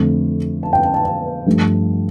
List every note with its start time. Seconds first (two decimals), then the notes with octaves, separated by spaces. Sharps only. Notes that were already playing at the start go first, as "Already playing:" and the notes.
Already playing: F2 D3 A3
0.63 A5
0.73 G5
0.83 A5
0.94 A5
1.05 A5
1.46 G2 F3 A3